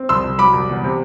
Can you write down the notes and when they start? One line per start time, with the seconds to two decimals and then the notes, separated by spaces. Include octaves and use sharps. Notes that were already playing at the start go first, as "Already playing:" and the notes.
Already playing: C4
0.09 C2 C6 E6
0.24 C2
0.38 F#3 B5 D6
0.53 C2
0.69 E2
0.84 C3